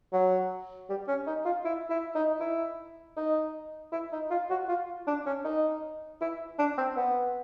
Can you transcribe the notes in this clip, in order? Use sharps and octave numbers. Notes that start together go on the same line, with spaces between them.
F#3
G3
C#4
D#4
F4
E4
E4
D#4
E4
D#4
E4
D#4
F4
F#4
F4
D4
C#4
D#4
E4
D4
C4
B3